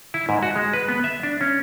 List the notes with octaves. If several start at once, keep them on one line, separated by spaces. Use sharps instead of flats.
E4
G#2
F#4
G#3
B4
B3
E5
D4
C#4